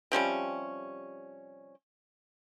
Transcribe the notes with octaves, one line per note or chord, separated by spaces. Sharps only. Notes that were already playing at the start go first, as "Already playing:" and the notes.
C3 F3 G3 C#4